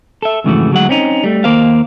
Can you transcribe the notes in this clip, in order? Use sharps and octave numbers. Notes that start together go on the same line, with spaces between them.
A4 E5
F2 G#2 C#3 E3 A3 F#4
D2 F#3 G#3 F#5
C4 C#4 D#4
G3 A3
D#2 A#3 A#4 C5 F5